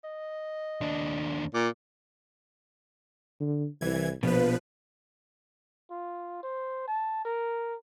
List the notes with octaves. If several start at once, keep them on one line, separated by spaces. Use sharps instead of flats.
D#5
D#2 D4
A#2 D6
D3
C2 E3 G#6
A#1 B2 F3 B3 B4
F4
C5
A5
A#4